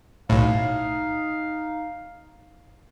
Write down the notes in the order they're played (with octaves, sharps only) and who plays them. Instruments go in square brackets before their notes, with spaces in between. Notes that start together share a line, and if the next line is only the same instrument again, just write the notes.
[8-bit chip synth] B1 A2 [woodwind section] D#4 F5